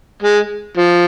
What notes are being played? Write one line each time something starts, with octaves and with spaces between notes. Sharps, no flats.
G#3
F3